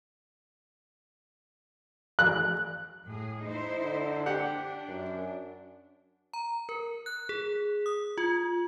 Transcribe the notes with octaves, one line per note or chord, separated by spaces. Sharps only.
F#6
A2 G#4
D#4 E4 C5
D3
D4 G4 F#5
F#2
A#5
A#4
F#6
G#4
D#6
F4